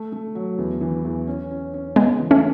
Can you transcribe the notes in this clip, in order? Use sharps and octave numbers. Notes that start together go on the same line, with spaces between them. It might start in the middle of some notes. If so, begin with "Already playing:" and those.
Already playing: A3
A3
F#3
E2
E3
E2
C#4
C#4
C#4
C#3 G#3 B3
E3
A3 C#4